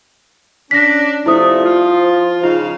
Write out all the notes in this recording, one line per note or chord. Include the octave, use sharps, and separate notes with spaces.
C#4 D4 A#6 B6
C3 F3 G3 A3 E4 C5 D#6
F4
C#3 D#4 F4 F5